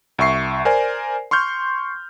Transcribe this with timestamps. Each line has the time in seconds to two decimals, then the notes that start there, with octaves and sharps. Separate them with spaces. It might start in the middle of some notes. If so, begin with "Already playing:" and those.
0.19 C2 E5 C#6 C7
0.65 A#4 C5 D5 G#5
1.31 C6 C#6 F6 G6